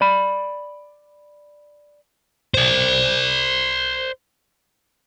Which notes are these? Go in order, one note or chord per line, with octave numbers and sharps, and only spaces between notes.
D5 B5
C5 D5